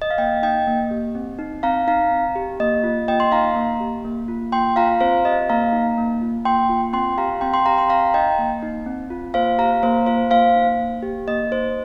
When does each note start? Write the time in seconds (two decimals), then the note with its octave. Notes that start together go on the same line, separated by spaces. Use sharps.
0.02 D#5
0.10 F5
0.18 A#3 D#5 G5
0.43 D#4 D#5 G5
0.67 A#3
0.91 G4
1.15 C4
1.39 D#4
1.63 C4 F5 A#5
1.87 D#4 F5 A#5
2.11 C4
2.36 G4
2.60 A#3 D#5
2.84 F4
3.08 A#3 D#5 G5
3.20 C6
3.32 D#4 F5 A#5
3.56 A#3
3.80 G4
4.05 A#3
4.28 F4
4.52 A#3 G5 C6
4.76 F4 F5 A#5
5.00 C4 C5 F5
5.25 G4 D#5
5.49 A#3 F5 A#5
5.72 D#4
5.98 A#3
6.21 F4
6.45 A#3 G5 C6
6.69 F4
6.93 C4 G5 C6
7.18 G4 F5 A#5
7.41 C4 G5 C6
7.54 G5 C6
7.65 G4 F5 A#5
7.77 G5 C6
7.90 C4 F5 A#5
8.14 D#4 D#5 G5
8.38 A#3
8.63 D#4
8.86 C4
9.10 F4
9.34 A#3 C5 F5
9.58 G4 F5 A#5
9.83 A#3 C5 F5
10.06 F4 C5 F5
10.31 A#3 C5 F5
10.55 D#4
10.80 A#3
11.03 G4
11.28 A#3 D#5
11.51 D#4 C5